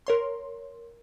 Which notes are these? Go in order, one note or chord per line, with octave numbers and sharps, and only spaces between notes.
A#4 C#5 C6